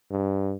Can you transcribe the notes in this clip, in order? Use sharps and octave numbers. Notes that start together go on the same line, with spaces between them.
G2